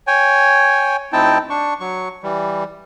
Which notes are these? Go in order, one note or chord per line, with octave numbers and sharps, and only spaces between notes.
C#5 G5 G#5
D2 C4 D#4 E4 G5 A5
D4 C#6
F#3 C#6
E3 G3